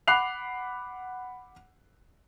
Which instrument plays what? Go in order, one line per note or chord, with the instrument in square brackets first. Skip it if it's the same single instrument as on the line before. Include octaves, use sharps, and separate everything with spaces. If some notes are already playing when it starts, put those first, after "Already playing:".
[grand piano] F#5 B5 D6 F#6 C7 F7